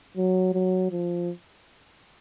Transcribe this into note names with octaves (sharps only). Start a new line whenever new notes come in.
F#3
F#3
F3